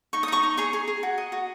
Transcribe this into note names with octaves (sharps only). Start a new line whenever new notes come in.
D#4 C#6
D#6
D#4 A#5 C#6
D#4
G#4 A#5 C#6
G#4
G#4
F#4
D#5
F#4